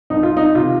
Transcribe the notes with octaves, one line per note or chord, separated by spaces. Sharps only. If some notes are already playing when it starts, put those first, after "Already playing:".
C2 D#4
F4
D#4
C3 D#3 F4